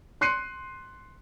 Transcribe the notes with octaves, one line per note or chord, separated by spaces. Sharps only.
C6 F#6 C7 C#7 D#7